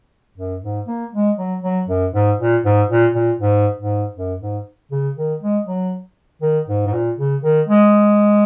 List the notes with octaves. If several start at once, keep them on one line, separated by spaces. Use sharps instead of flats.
F#2
G#2
A#3
G#3
F#3
F#3
F#2
G#2
A#2
G#2
A#2
A#2
G#2
G#2
F#2
G#2
C#3
D#3
G#3
F#3
D#3
G#2
G#2
A#2
C#3
D#3
G#3